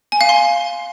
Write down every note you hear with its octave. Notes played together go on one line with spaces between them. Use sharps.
G#5
F5
C6